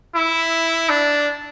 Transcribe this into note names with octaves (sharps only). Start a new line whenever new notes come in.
E4
D4